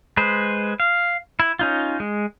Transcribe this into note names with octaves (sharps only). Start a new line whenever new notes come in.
G#3 B4 C5
F5
E4
C#4 D#4 F4
G#3